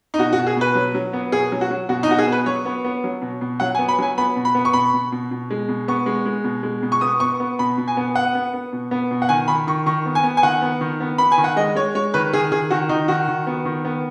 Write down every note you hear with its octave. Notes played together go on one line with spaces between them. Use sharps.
D#4
B2 F#4
F#4
B2
G#4
B2 B4
F#3
F#3
B3
B2 G#4
F#3
F#4
F#3
B2 F#4
D#4
B2 F#4
G#4
B3
B4
F#3 C#5
B3
B3
F#3
B2
B2
F#3 F#5
G#5
B3
B5
F#3 G#5
B3 B5
B2
B5
B3
C#6
B2 B5
B2
B2
B2
G#3
B2
B3 C#6
G#3
G#3
B2
G#3
B2
C#6
B3 D#6
B3 C#6
B3
B2 B5
B2
G#5
B3
B3 F#5
B3
B3
B2
B3
B2
F#5
D#3 G#5
D#3 B5
D#3 C#6
D#3 C#6
B3
G#5
B3
G#5
D#3 F#5
B3
D#3
B3
B3 B5
G#5
D#3
F#5
G#3 D#5
G#3 C#5
G#3 C#5
D#3 B4
D#3 G#4
D#3 G#4
D#3 F#4
D#3 D#4
D#3 F#4
D#3
B3
D#3
B3